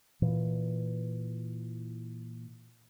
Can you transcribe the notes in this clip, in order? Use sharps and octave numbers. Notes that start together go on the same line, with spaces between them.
A#2 E3